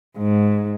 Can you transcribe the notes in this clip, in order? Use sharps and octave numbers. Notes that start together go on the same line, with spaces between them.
G#2